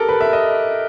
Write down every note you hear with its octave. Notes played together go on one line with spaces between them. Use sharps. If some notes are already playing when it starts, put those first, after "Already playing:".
Already playing: G4 A4 A#4
B4
E5
D#5